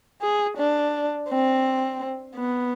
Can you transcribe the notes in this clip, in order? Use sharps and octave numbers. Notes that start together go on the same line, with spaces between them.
G#4
D4
C4
B3